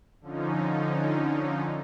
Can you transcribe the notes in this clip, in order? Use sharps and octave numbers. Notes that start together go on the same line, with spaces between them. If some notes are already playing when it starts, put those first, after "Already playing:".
D3 F3 C#4 D#4